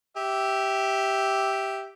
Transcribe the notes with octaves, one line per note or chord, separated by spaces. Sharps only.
G4 E5